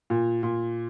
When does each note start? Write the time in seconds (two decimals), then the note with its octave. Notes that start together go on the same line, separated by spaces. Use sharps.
0.10 A#2
0.43 A#2